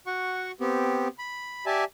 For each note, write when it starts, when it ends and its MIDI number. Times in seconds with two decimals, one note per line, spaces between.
0.06 0.52 66
0.06 0.52 78
0.06 0.52 85
0.60 1.08 59
0.60 1.08 60
0.60 1.08 67
1.19 1.65 83
1.66 1.84 67
1.66 1.84 74
1.66 1.84 76
1.66 1.84 80
1.66 1.84 81